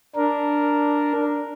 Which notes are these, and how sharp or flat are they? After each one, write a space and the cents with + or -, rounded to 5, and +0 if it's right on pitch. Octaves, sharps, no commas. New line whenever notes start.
D4 +0 A#4 +0